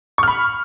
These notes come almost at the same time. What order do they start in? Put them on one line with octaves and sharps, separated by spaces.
C#6 F6 B5